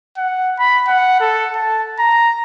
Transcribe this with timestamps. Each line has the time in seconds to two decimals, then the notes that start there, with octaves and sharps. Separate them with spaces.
0.17 F#5
0.59 B5
0.88 F#5
1.20 A4
1.56 A5
1.99 A#5